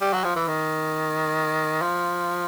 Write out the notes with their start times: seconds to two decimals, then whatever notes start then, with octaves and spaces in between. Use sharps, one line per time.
0.01 G3
0.13 F#3
0.24 F3
0.36 E3
0.48 D#3
1.82 F3